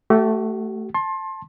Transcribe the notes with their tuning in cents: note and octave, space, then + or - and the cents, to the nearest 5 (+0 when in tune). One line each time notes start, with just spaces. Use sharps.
A3 +0 G4 -40 F#5 +0
A5 +0 C6 +25